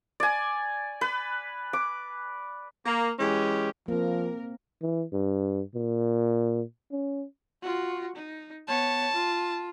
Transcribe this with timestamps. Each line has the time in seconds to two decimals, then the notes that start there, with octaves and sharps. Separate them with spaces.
0.20 D5 G#5
1.01 B4
1.73 D6
2.85 A#3
3.19 E3 G#3 C#4 G4
3.88 F3 A#3 C4 A#4
4.82 E3
5.13 G2
5.75 A#2
6.92 C#4
7.62 F4 F#4
8.16 D#4
8.68 B3 C#5 A5
9.13 F4